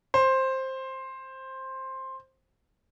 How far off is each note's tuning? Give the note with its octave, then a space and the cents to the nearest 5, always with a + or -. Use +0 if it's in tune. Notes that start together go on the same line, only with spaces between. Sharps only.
C5 +10